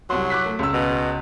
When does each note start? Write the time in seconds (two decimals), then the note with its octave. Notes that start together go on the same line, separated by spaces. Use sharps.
0.10 C2 F#3 C6
0.30 D6 F#6 B6
0.46 A3
0.59 C#2 E6
0.74 B2